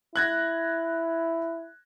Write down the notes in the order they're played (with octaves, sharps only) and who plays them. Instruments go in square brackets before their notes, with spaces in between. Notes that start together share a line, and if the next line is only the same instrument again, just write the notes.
[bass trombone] E4 [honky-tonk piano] F#6 G#6 A#6